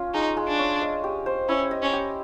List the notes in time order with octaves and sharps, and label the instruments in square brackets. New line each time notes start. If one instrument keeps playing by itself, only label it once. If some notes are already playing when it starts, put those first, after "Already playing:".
Already playing: [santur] C#4 F4
[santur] G#3 [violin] D#4
[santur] G#3
[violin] D4
[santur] C#4
D#5
G4
C5
[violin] C#4 [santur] E4
[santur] D#5
[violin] C#4
[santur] G4